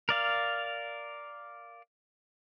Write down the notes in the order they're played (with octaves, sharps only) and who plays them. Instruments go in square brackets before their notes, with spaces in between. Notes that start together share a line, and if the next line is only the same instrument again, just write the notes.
[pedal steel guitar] A#4 D5 F5